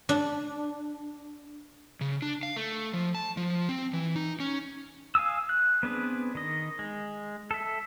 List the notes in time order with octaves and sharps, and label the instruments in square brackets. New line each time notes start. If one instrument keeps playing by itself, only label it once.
[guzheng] D4
[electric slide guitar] C#3
D4
F5
A3
F3
A5
F3
C4
E3
D#4
C#4
[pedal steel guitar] F5 G#5 D#6 E6
F#6
B3 C4 D4 G#4 B4
D#3 D#5
G#3
A4 E5